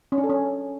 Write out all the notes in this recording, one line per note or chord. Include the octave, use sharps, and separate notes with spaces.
C#4
D4
A4
C#4